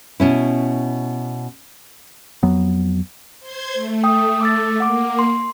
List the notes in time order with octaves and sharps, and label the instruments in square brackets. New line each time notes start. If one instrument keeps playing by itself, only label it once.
[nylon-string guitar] B2 C#4 E4
[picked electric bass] F2 F#3 B3
[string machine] C5 C6 G#6
A3
[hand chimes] G5 D#6
D6 E6 A6
[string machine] A#3 [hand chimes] F#5 D6
[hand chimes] C6